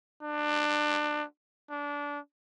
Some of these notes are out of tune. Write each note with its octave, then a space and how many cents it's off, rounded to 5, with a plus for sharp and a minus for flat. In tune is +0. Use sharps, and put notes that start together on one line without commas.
D4 +25
D4 -20